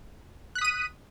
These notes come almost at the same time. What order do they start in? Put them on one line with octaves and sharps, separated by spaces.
F#6 B6 D#6 D#7